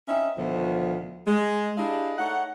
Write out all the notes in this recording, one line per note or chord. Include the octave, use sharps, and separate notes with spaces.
C4 C#4 D#4 E5
D2 B2 D#3 F3
G#3
D4 E4 G4 G#4 D#5 F5
A3 D#4 C#5 F#5